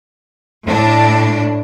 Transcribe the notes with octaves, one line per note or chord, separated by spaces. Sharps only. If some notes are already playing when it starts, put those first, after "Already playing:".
A2 D4